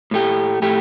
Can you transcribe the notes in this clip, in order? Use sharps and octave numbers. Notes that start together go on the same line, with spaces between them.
A2 A3 G4
A2 A3 G4